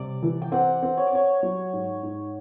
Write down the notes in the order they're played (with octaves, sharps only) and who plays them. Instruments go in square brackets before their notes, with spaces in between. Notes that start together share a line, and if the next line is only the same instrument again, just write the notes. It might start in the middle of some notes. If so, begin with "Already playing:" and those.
Already playing: [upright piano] C3 G3 [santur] D5
[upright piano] E3
[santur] G5
[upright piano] C4 [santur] F#5
[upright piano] C4
[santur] C#5
D5
[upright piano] C4 [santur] C#5
[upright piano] F#3
G#2
G#2